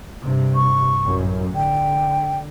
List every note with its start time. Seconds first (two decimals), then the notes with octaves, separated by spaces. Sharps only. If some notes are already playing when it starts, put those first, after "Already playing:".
0.24 G2 C3
0.55 C#6
1.05 A1 F#2
1.55 D3 G5